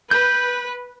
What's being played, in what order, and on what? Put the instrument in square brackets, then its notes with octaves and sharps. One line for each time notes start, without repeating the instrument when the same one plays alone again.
[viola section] B4 [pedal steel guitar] G6